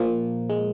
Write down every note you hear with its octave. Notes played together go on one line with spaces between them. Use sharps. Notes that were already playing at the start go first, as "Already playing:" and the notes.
Already playing: A#2 F3 A#3
G#3